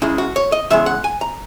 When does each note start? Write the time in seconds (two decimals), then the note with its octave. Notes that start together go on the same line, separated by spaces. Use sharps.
0.02 C#2 C#3 G#3 E4
0.18 F#4
0.36 C#5
0.52 D#5
0.70 E2 C#3 G#3 E5
0.86 F#5
1.04 G#5
1.21 A#5